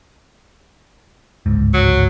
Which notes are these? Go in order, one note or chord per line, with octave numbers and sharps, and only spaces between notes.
G1 C#2 G#2
F#3